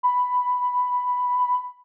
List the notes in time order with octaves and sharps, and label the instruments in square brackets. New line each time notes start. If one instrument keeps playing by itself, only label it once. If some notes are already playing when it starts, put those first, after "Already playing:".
[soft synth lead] B5